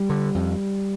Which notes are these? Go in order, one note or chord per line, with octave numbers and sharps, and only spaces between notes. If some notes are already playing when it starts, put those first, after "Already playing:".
Already playing: G3
D3
F2